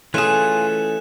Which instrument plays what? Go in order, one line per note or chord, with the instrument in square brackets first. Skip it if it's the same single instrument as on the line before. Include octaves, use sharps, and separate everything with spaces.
[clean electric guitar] E3 A3 C#4 [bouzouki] F4 G#4 [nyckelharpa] A4 [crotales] F#6 E7